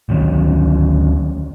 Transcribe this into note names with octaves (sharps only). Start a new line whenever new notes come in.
D2 D#3 F#3 C#4